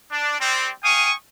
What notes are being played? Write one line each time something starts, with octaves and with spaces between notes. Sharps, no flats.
D4
G3 C4
F5 G5 G#5 C#6 D#6